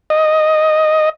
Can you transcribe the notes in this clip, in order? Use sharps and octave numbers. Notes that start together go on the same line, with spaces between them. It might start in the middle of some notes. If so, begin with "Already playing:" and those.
D#5